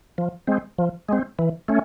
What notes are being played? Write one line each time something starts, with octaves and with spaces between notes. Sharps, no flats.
F3
G#3 C4
F3
G#3 C4
E3
A3 C#4